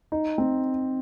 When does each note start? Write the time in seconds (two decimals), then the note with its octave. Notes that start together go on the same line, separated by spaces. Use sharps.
0.12 D#4
0.38 C4